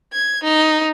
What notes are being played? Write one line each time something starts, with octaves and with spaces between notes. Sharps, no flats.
G#6
D#4